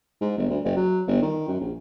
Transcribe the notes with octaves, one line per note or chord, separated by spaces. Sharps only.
G#2
G1
D2
F#1
F#3
G1
D#3
F#2
A#1